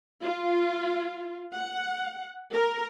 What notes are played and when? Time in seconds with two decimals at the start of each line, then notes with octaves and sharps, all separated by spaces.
0.22 F4
1.55 F#5
2.53 A#4